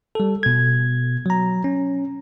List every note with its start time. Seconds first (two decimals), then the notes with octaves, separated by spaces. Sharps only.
0.15 G3 A4
0.43 B2 G#6
1.26 F#3 A#5
1.64 C#4